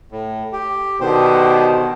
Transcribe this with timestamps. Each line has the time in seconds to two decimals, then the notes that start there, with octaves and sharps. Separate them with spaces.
0.12 A2
0.53 G4
1.01 B2 D3 D#3 G4 C5